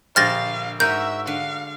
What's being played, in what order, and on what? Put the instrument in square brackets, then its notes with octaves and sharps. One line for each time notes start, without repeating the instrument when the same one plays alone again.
[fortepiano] A#1 G4 C5 [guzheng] D3 [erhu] F5 [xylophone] F6 A6 A#6
[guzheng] G#2 F#4 G#5 [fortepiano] A#4 [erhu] E5 [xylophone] G6
[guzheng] D3 [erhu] F5